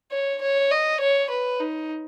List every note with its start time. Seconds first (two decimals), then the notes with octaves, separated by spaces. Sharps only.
0.12 C#5
0.41 C#5
0.71 D#5
1.01 C#5
1.30 B4
1.60 D#4